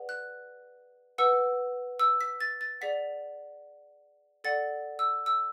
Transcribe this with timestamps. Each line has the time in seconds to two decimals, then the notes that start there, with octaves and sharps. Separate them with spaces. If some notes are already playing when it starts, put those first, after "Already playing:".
Already playing: G#4 B4 D5 F#5
0.09 F#6
1.18 B4 F#5 E6
2.00 E6
2.21 B6
2.40 A6
2.61 A6
2.81 G#4 D5 F#5 B6
4.44 A4 D5 F#5 A6
4.99 E6
5.26 E6